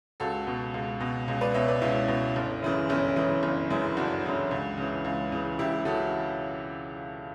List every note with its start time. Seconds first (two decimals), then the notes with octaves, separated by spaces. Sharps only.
0.20 C#2 F#4 A4
0.47 B2
0.74 C#2
1.00 B2
1.28 C#2
1.41 B4 D5
1.54 B2 C#5 E5
1.68 B4 D5
1.81 C#2 C#4 E4
2.08 B2
2.36 G1
2.62 F#2 C#3 E3
2.89 G1 C#4 E4
3.16 F#2 C#3 E3
3.43 G1
3.70 F#2 C#3 E3
3.97 G1 D4 F#4
4.24 F#2 C#3 E3
4.51 C#2
4.78 C#3 E3
5.04 C#2
5.32 C#3 E3
5.59 C#2 E4 G4
5.85 C#3 E3 F#4 A4